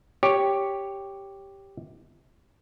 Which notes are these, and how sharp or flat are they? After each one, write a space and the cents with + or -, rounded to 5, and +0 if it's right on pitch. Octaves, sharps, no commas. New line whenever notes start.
G4 +0 C#5 +0